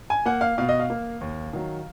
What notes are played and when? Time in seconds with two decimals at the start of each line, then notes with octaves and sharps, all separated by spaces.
0.10 G#5
0.26 A#3 F#5
0.41 F5
0.58 B2 F5
0.69 D#5
0.80 F5
0.90 A#3
1.21 D#2
1.53 D#3 F#3